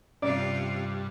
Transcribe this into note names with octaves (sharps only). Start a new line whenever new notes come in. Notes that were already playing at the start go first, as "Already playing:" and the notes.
G2 C3 C#4 F4 D5